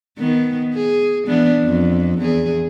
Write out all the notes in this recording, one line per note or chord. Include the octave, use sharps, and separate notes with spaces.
D#3 B3
G#4
E3 B3 D4
F2
E2 G#4